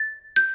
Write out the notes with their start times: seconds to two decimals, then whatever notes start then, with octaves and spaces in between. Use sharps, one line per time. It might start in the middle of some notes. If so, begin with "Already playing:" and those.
Already playing: A6
0.36 G6